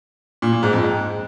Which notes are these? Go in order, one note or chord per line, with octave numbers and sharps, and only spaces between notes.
A#2
A#2
G#2
F2
G#2